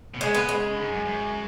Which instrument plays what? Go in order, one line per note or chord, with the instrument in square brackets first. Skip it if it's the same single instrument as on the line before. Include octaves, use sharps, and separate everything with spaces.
[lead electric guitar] B2
[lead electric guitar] C#3 [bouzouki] G#3
[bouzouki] B3
G#3
[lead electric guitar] G#2
F#2
F#2